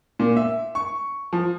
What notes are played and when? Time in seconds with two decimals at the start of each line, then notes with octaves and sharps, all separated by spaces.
0.19 A#2
0.36 E5
0.75 C#6
1.33 F3